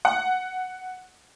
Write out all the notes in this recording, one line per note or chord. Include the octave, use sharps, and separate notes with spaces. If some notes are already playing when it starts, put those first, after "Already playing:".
F#5